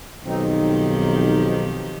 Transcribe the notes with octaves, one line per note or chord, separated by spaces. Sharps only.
B1 D#3 F3 C4 D#4 G4